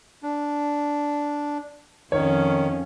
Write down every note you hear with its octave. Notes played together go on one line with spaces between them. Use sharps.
D4
F2 D#3 C#4 C#5